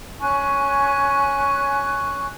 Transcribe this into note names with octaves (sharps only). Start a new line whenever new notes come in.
C#4 G#5 C#6 F#6